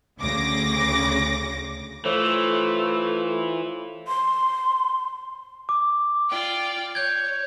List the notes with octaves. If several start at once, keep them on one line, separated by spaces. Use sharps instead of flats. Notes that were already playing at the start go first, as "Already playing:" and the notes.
D2 C#3 D6 A#6
E3 A3 F4 A4 C5 C#5
C6
D6
F4 D5 G5
C#5 G6 G#6